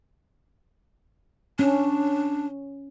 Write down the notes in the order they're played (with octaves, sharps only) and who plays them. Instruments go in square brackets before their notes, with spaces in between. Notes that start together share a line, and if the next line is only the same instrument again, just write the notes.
[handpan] C#4 [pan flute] D4